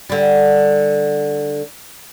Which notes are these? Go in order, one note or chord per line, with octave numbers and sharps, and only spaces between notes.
D3 G3